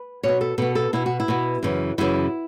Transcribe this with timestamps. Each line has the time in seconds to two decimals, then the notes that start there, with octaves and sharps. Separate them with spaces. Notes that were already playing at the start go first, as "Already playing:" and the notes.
Already playing: B4
0.23 B2 B3 C#5
0.41 A4
0.58 B2 B3 A4
0.75 A4
0.93 B2 B3 E4
1.06 F#4
1.20 E4
1.28 B2 B3
1.63 F#2 C#3 E3
1.98 F#2 C#3 E3 E4